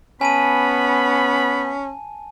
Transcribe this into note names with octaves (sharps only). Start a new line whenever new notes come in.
B3 C#4 G#5 A5 B5 D#7